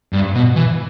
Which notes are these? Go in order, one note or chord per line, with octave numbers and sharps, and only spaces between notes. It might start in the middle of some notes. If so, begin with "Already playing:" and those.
G2
B2
E3